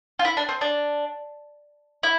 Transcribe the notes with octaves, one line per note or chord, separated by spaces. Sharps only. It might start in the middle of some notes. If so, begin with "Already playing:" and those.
F4
E4
D4
C4
D4
E4